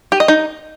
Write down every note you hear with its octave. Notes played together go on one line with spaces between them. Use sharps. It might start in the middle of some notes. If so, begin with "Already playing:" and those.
G4
D#5
D#4